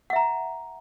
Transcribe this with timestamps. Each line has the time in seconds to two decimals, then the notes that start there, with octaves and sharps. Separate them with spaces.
0.10 F#5
0.13 E5
0.16 A#5